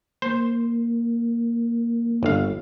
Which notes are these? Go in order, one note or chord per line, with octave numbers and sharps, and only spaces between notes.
A#3 C5
G1 F5